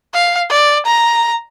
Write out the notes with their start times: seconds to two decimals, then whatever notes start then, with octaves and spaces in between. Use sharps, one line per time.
0.14 F5
0.50 D5
0.86 A#5